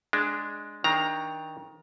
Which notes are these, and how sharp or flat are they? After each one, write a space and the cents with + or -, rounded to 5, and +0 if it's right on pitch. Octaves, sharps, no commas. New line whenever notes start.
G#3 +0 D4 +0
D#3 +25 D4 +20 A#5 +0